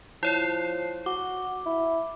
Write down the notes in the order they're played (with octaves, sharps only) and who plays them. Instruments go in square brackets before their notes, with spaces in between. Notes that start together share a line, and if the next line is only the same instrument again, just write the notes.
[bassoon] F3 [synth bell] E4 C#5 C7
[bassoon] F#4 [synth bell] D6
[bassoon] E4